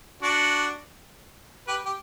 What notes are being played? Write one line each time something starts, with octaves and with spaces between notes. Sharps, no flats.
D4 F#4
G4 B4
G4